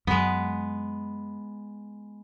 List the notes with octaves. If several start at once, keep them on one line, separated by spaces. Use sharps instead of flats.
F#2 G#3 B3